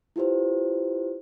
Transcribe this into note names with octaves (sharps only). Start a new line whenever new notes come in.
E4 F4 G4 B4 C5